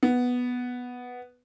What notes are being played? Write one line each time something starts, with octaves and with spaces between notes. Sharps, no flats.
B3